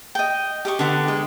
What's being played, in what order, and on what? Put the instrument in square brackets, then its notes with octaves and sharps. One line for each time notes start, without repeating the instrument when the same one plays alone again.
[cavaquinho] D#5 G5
G4 D#5 C#6
[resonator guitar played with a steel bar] D3 B3
G#3